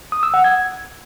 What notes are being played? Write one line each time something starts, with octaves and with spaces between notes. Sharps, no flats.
D#6
E6
F#5
G#6